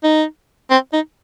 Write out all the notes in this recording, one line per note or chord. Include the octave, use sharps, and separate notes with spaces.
D#4
C4
D#4